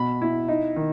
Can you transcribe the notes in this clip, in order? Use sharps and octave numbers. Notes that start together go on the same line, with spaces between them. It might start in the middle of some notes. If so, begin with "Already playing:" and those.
Already playing: B2 B5
E4
D#4
D#3